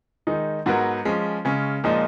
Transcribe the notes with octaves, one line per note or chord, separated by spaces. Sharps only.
D#3 G#3 D#4
G#2 F#3 B3 F#4 A#4
F3 G#3 C#4
C#3 G#3 C#4
A#2 F3 G#3 D#4